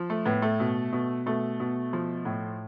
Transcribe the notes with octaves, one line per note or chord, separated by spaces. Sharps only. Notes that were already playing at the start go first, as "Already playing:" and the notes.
Already playing: F3
A3
A2 B3
A3
B2
B2
B2 A3
B2
F3
A2